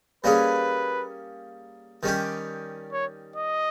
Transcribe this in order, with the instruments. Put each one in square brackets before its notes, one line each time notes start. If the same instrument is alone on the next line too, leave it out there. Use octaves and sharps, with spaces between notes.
[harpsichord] G3 A#3 C#4 G#4 [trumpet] B4
[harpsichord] D#3 G3 C#4 G4
[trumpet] C#5
D#5